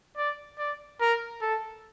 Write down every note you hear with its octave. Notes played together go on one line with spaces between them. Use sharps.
D5
D5
A#4
A4